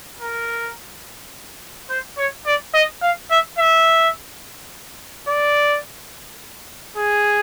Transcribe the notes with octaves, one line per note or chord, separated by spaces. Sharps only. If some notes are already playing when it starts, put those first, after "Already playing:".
A#4
C5
C#5
D5
D#5
F5
E5
E5
D5
G#4